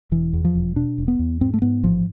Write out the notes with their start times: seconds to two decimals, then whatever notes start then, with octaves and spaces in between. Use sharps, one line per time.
0.11 E1 E3
0.33 E2
0.45 F3
0.55 E1
0.76 B2 D4
0.98 E1
1.08 B3
1.19 E2
1.41 G#2 C4
1.54 A3
1.62 G#2 B3
1.83 A1 F3